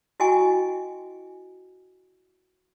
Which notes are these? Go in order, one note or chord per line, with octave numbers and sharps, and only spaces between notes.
E4 F#4 D#5 G5 G#5 C#6